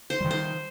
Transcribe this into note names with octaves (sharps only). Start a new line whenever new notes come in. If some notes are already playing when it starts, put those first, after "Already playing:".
C5
D#3 G3
C5